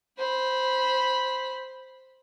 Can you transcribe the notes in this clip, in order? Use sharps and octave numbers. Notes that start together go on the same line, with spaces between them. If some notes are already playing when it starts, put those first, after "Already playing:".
C5 B5